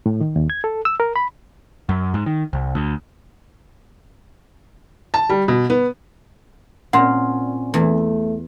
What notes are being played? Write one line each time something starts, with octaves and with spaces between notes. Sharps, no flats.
A2
D#3
D#2
G#6
A4
E6
A#4
B5
F#2
G#2
D#3
C2
D2
A5
G3
B2
B3
A#2 C4 C#4 F#5 C6
E2 A3